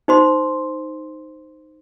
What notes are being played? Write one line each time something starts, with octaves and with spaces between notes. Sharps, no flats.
D#4 C5 C6